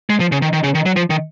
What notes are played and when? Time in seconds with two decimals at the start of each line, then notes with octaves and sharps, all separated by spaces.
0.10 G#3
0.20 F3
0.32 C#3
0.42 D#3
0.53 D#3
0.64 C#3
0.75 D#3
0.86 F#3
0.96 F3
1.10 D#3